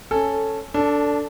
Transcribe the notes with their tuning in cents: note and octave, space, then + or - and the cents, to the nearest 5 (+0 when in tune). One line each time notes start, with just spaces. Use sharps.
C#4 +0 A4 +0 G#5 +0
D4 -15 A4 +15